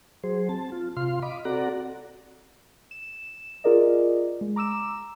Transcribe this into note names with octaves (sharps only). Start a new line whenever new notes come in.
F#3 G#4 C5
C4 A5
F4
C3 F4 F5 C6
D#5 B5 D6
C4 F#4 A4 D5 F#5 A#5
E7
F4 G#4 A#4 D5 D#5
G#3
A#5 D6 E6 E7